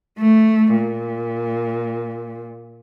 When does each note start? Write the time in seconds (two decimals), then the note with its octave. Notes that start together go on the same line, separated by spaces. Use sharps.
0.18 A3
0.76 A#2